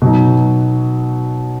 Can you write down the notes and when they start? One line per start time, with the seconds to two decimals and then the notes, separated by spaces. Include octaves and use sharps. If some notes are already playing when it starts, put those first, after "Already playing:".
0.02 B2 F#3 D#4